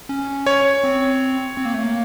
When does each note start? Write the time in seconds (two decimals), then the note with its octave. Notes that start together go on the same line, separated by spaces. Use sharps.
0.09 C#4
0.46 C#5
0.84 C4
1.57 C4
1.65 A#3
1.74 A3
1.83 A#3